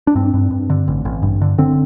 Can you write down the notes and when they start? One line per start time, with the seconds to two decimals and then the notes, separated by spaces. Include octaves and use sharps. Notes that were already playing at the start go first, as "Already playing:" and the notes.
0.07 D4
0.15 G2 C4
0.34 G2
0.50 G2
0.70 D3
0.88 A1
1.05 A1
1.23 G2
1.42 D3
1.58 D3 C4